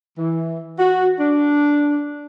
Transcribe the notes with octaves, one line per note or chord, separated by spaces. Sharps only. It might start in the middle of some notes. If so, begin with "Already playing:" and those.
E3
F#4
D4